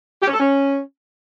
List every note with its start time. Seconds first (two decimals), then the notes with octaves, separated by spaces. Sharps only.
0.22 G4
0.28 C#4
0.34 A4
0.39 C#4